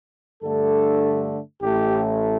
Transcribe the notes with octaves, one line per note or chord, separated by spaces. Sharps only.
G2 D3 A3 A4
A1 A2 A3 G4